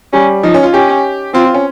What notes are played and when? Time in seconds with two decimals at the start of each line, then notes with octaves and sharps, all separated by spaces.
0.13 G3 C#4
0.43 F3 D#4
0.54 C#4
0.63 F4
0.74 C#4 G4
1.34 C4 F4
1.45 F4
1.54 C#4